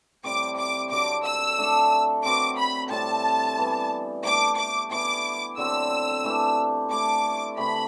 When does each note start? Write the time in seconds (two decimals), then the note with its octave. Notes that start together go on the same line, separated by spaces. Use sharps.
0.24 A2 G3 C4 D6
0.57 D6
0.90 D3 F#3 C4 F#4 D6
1.24 E6
1.58 A3 D4 A4
2.24 F#3 C4 F#4 B4 D6
2.57 B5
2.91 A2 G3 C4 A5
3.57 E3 G3 B3
4.24 A3 D4 G4 B4 D6
4.57 D6
4.91 E3 B3 E4 D6
5.57 D3 F#3 C4 E6
6.24 E3 A3 D4 G4
6.90 A3 E4 A4 D6
7.57 C3 E3 A3 B5